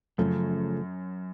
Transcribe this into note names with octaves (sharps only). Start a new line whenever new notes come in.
F#2 C#3 F3 A3